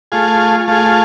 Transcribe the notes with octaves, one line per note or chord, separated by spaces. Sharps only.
A3 F4 G#4
A3 F4 G#4